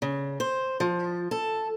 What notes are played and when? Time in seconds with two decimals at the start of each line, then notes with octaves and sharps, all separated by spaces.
0.02 C#3
0.40 C5
0.80 F3
1.31 A4